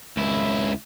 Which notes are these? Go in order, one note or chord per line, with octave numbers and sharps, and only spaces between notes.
C#2 E4